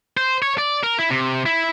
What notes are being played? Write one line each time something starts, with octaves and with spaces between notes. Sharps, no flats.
C5
C#5
D5
A#4
E4
C3
E4